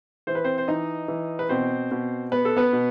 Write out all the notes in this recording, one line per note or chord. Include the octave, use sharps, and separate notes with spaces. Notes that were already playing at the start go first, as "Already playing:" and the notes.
E3 C5
B4
C4 C5
C5
E3 D#4 D#5
E3
B4
B2 C4 C5
B2
B3 B4
A4
B3 B4
B2